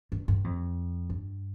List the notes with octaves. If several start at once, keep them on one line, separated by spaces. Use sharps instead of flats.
G2
G2
F2
G2